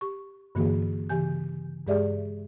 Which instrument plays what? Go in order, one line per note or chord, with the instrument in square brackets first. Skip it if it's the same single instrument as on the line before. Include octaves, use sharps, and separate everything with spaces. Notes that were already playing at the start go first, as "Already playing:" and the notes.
[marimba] G4 C#6
G2 D3 E3 A#3 F#4 G#4
C#3 E3 G4 G#5 G6
G2 G#3 G4 G#4 D5 E5